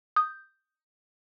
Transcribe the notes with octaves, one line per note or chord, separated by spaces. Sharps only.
D#6 G6